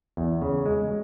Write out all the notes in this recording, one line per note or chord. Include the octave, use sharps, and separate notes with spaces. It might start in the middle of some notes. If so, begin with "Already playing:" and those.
E2
C#3
G#3